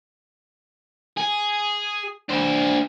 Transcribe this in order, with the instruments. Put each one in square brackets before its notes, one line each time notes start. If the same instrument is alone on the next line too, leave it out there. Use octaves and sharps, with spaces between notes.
[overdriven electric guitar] G#4
D4 C5